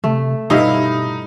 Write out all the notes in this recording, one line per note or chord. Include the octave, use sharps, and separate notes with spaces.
C3 A3
G2 B2 D#4 E4 F5